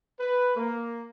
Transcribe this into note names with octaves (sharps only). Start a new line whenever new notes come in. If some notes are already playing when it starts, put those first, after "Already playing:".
B4
A#3